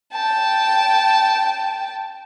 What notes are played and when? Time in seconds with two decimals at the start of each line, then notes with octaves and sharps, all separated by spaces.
0.13 G5 A5